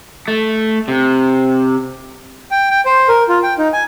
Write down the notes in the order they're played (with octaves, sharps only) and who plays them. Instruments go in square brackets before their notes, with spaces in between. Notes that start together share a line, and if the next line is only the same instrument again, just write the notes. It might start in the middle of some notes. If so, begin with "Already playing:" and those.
[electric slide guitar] A3
C3
[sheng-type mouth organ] G5
G5
C5
A#4
F4
G5
D#4
G#5